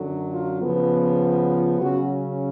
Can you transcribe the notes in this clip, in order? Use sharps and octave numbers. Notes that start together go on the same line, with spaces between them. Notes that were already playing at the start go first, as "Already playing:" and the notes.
Already playing: F#2 D3 F#3
F4
C#3 F3 B3
F4
C#3 F#3 C#4 F#4